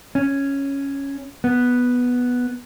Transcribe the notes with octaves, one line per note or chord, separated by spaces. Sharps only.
C#4
B3